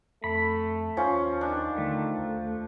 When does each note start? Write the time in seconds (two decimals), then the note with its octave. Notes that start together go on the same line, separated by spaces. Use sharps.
0.24 F2 A3 B5
0.97 D#2 F3 C#4
1.41 D#3 D4
1.78 D3 A3
2.18 D#2